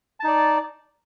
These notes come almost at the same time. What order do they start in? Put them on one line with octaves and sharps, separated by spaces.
A5 D#4 D5